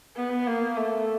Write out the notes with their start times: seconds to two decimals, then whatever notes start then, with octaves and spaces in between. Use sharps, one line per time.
0.17 B3
0.47 A#3
0.76 A3